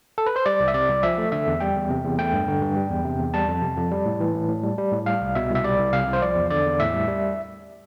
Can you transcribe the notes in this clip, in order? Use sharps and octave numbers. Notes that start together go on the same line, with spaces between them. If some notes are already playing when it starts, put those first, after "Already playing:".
A4
B4
C5
G3 D5
C2
E5
C3 D5
C2
F3 E5
A3
D3 E5
E2
G3 G5
E2
C3
E2
A3 G5
G2
D3
G2
G3
E2
C3
E2
G3 A5
F2
C3
F2
G3
A2
E3
A2
A2
G3
G3
A2
G3 F5
C2
B2 E5
C2
E5
G3 D5
C2
C3 F5
C2
C5
F3 D5
E2
D3 D5
E2
A2 E5
G3
G3